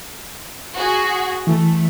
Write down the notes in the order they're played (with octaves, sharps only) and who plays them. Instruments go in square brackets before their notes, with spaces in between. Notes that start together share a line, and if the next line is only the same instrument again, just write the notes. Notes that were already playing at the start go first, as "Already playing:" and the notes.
[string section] F#4 G#4
[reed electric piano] E3 [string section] A3